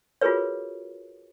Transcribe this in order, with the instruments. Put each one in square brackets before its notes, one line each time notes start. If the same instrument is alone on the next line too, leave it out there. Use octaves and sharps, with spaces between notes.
[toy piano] F4 F#4 G#4 A#4 B4 C#5